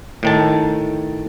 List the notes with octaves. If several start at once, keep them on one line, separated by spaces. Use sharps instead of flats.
A2 D#3 A5